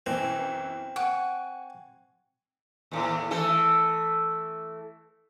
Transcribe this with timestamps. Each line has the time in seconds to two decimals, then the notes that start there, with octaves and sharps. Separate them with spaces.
0.06 B1 F#2 E3 C4
0.96 F#5 G#5 C#6 D7
2.91 D#2 A2
3.31 E3 A3 A4